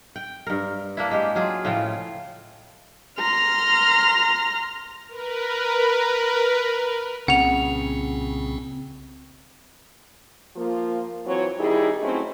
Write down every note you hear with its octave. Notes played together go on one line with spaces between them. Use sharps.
G5
G2 A#4
A#3 D4 E4
G#3 G4
F#3 F4 G#4
A2 C#3 F3 F4
A#5 C6 F6
A#4 B4
C2 A#2 C#3 C4 F#5 F7
F3 A#3 F4
E3 F#3 C4 C#5
D#3 G3 D#4 E4 G#4
F#3 A3 C4 C#4 D#4 E4